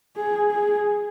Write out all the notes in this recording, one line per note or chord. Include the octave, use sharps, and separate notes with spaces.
G#4
G#4